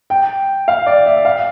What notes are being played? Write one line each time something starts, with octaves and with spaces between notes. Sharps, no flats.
G5
F5
D5
E5
F5